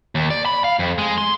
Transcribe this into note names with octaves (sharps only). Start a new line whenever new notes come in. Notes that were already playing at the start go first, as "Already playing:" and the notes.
D#2
D5
B5
F5
F2
G#3
C6